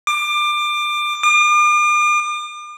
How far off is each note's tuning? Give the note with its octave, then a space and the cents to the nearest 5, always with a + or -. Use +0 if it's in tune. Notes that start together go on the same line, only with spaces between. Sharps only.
D6 +25
D6 +45